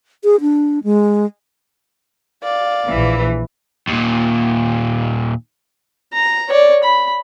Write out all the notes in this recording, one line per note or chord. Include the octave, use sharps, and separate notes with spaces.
G#4
D4
G#3
D5 F5
A#1 E3
D#2 A#2
A#5
C#5 D5
B5